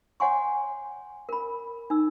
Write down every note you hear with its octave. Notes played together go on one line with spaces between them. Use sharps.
C#5 D#5 F#5 G#5 C6 C#6
A#4 B5
D#4 E6